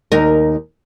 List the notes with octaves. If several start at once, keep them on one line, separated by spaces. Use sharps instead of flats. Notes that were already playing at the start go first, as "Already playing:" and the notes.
D#2 D#4 A#4